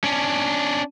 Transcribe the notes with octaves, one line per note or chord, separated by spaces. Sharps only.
C#4 D4